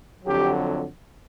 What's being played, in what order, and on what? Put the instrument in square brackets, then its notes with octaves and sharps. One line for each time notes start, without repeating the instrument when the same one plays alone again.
[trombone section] F2 D3 F#3 G4